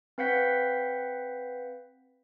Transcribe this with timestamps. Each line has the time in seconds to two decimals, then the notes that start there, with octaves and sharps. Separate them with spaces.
0.18 C4 B4 F5 F#5 G6 B6